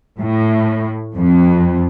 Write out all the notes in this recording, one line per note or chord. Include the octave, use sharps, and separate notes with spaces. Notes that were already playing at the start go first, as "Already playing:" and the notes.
A2
F2